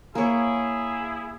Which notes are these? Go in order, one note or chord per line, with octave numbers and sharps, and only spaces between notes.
A#3 E4 G#4 C#5